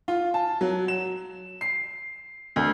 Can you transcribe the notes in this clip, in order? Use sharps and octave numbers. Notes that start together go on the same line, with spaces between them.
F4
A5
F#3
E7
C7
D2